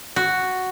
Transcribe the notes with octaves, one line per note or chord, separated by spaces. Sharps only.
F#4